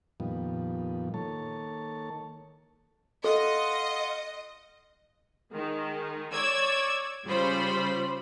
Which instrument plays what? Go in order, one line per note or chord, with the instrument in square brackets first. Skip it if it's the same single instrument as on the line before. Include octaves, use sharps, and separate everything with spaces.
[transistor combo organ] F2 A#2 D#3 F3 G3 B3
D#3 A#3 A4 C#5 A5
[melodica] F4 F5 F#5 [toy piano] A4 [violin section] D#5
[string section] D#3 G#3
C#5 D5 E6 G#6
C#3 G3 F4 C5 B5